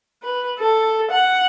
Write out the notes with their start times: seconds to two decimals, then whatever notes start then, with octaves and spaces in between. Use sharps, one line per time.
0.23 B4
0.59 A4
1.11 F#5